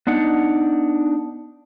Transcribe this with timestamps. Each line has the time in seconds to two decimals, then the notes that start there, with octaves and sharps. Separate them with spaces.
0.07 B3 D4 D#4 F#5